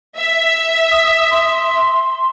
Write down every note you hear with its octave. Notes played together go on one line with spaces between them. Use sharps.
E5
D#6
C6